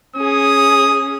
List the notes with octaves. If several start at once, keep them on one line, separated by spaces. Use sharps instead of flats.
C#4 G#4 D#6